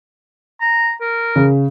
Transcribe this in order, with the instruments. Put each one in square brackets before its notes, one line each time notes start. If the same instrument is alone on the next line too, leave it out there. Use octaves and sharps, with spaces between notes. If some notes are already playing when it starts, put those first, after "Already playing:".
[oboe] A#5
A#4
[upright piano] C#3